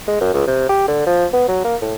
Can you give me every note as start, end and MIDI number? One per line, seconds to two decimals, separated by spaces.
0.08 0.20 56
0.21 0.33 42
0.34 0.43 37
0.47 0.68 48
0.69 0.86 67
0.88 1.04 50
1.06 1.26 53
1.33 1.44 59
1.48 1.61 54
1.64 1.76 58
1.82 1.95 45